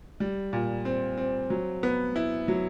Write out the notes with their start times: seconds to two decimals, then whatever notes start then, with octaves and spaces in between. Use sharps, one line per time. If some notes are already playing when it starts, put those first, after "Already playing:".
0.20 G3
0.53 A#2
0.85 C4
1.17 C4
1.50 F#3
1.83 B3
2.16 E4
2.48 F#3